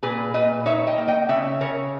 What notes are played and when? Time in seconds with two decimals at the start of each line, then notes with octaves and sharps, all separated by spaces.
0.03 A#2 G#4 B4
0.34 A#2 B4 D#5
0.66 D#4 C#5 E5
0.87 D#5 G5
0.98 A#3
1.08 D#5 G5
1.29 C#3 C#5 E5
1.61 C#3 A#4 C#5